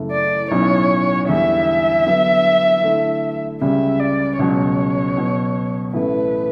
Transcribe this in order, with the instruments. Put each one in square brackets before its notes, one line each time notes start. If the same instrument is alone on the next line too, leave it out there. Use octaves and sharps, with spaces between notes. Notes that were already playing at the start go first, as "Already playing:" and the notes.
Already playing: [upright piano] F#1 F#2 C#3 E3 A3
[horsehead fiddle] D5
[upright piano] B1 A2 F#3 C#4 [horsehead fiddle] C#5
[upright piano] E2 D3 G3 [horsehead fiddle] E5
[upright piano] D3 F#3 B3
D3 A3 E4
[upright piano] C#2 C#3 G3 [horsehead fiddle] E5
[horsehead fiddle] D5
[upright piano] C#2 B2 F#3 [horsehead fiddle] C#5
[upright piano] B2 F#3 B3
[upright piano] A1 A2 E3 A3 E4 [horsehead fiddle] B4